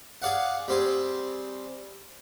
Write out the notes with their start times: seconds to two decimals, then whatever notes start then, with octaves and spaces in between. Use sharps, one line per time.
0.22 G#4 D5 F5 F#5
0.68 G3 C4 G#4